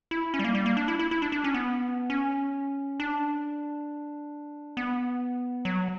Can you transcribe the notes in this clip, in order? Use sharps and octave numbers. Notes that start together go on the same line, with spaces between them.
E4
C#4
G3
A#3
G3
A#3
D4
E4
E4
E4
D4
D4
C#4
B3
C#4
D4
B3
F#3